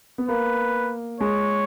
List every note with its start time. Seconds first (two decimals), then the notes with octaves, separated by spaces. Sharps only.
0.18 B3
0.28 A#3 B4
1.20 G#3 C#5